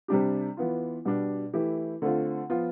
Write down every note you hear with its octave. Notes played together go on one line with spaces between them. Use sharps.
C3 G3 D4 G4
E3 B3 F4
B2 G3 D4
E3 A3 E4 G4
D3 A3 C4 F4
F3 B3 F4